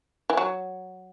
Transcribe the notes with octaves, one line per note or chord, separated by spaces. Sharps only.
E3
F#3